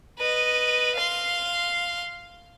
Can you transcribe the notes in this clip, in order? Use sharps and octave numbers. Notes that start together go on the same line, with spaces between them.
B4 D#5
F5 C6